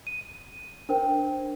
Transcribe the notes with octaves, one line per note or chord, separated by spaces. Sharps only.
D#7
D4 A#4 C5 G5